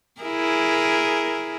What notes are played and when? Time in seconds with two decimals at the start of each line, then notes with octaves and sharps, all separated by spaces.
0.21 E4 G#4 A#4